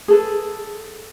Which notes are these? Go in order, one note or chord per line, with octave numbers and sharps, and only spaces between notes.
G#4 A4 B4